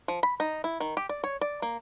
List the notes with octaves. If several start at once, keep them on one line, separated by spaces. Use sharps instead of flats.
F3
B5
D#4
E4
D#3
G4
D5
C#5
D5
A#3